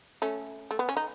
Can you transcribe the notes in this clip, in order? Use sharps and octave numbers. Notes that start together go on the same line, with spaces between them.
A3 C#4
A3
B3
C#4
D#4